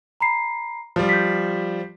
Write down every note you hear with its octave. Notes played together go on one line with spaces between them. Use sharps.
A#5 B5 C7
F3 G3
G6 B6